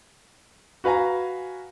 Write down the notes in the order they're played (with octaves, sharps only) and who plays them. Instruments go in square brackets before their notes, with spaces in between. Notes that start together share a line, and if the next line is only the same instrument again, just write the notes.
[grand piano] F#4 B4 F5 G#5 A#5